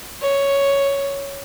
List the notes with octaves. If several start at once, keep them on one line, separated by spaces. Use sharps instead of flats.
C#5